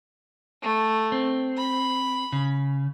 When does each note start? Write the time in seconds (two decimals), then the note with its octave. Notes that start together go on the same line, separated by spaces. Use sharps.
0.62 A3
1.12 C4
1.57 B5
2.32 C#3